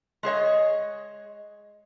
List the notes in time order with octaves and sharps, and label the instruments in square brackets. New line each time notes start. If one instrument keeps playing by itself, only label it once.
[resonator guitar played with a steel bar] G#3 G#4 C#5 D#5